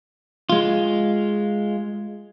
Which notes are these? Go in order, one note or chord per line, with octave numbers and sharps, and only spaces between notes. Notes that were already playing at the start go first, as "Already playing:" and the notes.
G#3 F4